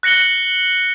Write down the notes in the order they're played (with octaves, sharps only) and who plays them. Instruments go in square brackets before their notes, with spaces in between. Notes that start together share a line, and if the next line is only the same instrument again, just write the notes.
[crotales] F#6 A#6 C#7 F#7 G7